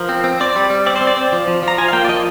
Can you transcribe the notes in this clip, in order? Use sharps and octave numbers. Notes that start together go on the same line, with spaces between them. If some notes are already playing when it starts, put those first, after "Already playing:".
Already playing: F3 A#4
C4
C4
C4 D5
G3
G3
C4 D5
C5
C4
D5
C4
F3
F3
F3 A#5
F4 G#5
F5
A#3 G5
D5
F3 D#5